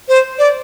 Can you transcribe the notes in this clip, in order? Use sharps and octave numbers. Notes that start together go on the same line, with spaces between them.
C5
D5